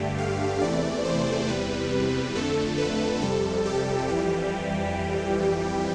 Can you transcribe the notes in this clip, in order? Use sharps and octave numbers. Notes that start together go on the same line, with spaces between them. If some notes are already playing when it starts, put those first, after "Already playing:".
Already playing: G2 D3 A3 G4
F5
E2 C3 E3 A3 D5
C5
E2 C3 G3 B4
F2 D3 A3 A4
B4
F2 C3 G3 A4
G4
F2 E3 G3